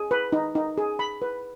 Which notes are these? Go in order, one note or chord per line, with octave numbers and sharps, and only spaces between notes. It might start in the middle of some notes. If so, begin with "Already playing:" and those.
Already playing: G#4
B4
D#4
D#4
G#4
B5
B4